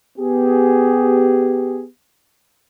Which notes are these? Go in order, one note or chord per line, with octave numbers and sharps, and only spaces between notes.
B3 G4 G#4